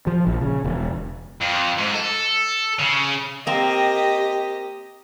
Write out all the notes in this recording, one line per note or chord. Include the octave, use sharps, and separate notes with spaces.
F3
A#1
C#3
E1
F2
G#2
A4
C#3
A#3 C4 G4 D#5